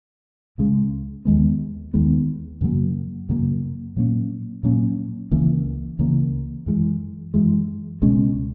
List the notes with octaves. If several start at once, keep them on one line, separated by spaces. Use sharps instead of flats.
C#2 C#3 G#3
D#2 D#3 G#3 B3
D#2 D#3 G#3 B3
F#2 C#3 F#3 A#3
F#2 C#3 F#3 A#3
A#2 F#3 A#3 C#4
A#2 F#3 A#3 C#4
C#2 C#3 E3 A#3
C#2 C#3 E3 A#3
F#2 E3 G#3
F#2 E3 G#3
C#2 B2 G#3 C#4